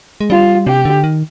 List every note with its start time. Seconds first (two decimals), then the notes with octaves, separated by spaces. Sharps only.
0.21 G#3
0.30 G3 F4
0.67 C3 G4
0.85 D3
1.04 D#3